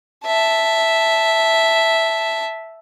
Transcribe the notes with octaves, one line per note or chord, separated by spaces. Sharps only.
E5 A5